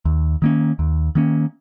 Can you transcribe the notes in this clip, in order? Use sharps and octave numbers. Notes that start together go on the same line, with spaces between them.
D#2
D#3 A#3 C#4
D#2
D#3 A#3 C#4